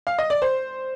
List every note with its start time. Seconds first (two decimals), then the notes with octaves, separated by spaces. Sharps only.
0.07 F5
0.18 D#5
0.30 D5
0.42 C5